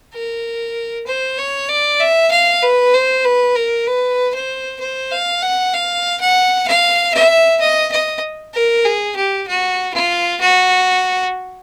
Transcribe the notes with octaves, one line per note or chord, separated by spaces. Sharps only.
A#4
C5
C#5
D5
E5
F5
B4
C5
B4
A#4
B4
C5
C5
F5
F#5
F5
F#5
F5
E5
D#5
D#5
A#4
G#4
G4
F#4
F4
F#4